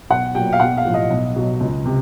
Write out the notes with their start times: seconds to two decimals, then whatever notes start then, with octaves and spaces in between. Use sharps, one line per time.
0.10 B1 F#5
0.35 A#2 F#3 G5
0.53 F5
0.60 B1 F#5
0.77 F5
0.85 A2 F3
0.94 D#5
1.10 B1
1.36 B2 F#3
1.60 C#2
1.85 C3